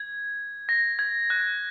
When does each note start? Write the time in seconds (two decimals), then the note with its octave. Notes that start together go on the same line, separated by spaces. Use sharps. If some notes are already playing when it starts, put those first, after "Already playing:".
Already playing: G#6
0.69 A#6
0.99 G#6
1.30 F#6